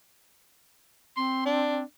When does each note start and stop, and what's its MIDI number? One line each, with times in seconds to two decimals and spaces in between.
1.17 1.83 60
1.17 1.42 84
1.46 1.83 62